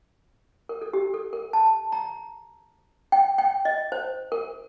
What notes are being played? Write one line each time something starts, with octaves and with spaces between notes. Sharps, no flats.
A#4
A4
G4
A4
A#4
A5
A#5
G5
G5
D#5
C5
A#4